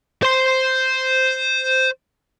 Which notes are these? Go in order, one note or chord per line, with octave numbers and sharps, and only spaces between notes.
C5 C6